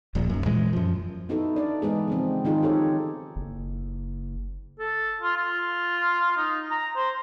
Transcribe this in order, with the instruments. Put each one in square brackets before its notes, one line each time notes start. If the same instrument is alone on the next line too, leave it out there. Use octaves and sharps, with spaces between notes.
[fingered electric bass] D1 A#1 A#2
B1 F#2
A#2 E3 G#3
F#2 F3
[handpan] B3 D#4 E4 F#4 A4
D4 A#4 D5
E3 G#3 B3 G#4
C#3 F3 C4
D#3 D#4 F4 G#4
G4 A4 C#5
[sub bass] F#1
[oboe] A4
F4
F4
D#4
A#5
C5